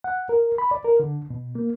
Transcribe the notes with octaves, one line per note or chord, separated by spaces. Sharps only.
F#5
A#4
B5
D5
A#4
D3
B2
A#3